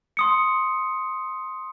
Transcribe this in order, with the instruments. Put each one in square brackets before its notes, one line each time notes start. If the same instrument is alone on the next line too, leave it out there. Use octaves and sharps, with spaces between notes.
[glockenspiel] C6 D#6 C#7